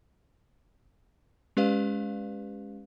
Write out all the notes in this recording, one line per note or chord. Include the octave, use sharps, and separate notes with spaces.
G#3 C#4 G4 B4 D5 F5